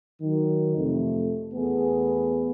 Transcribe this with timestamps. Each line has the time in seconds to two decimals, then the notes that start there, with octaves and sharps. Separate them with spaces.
0.22 D#3 F#3
0.77 F2 C3 A3
1.54 E2 A3 B3 G#4